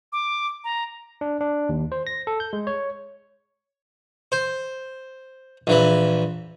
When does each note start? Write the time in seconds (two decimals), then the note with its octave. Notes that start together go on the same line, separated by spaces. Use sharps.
0.12 D6
0.64 A#5
1.21 D4
1.41 D4
1.69 D#2
1.92 C5
2.07 A#6
2.27 A4
2.40 G6
2.53 G#3
2.67 C#5
4.32 C5
5.67 A#1 E3 B5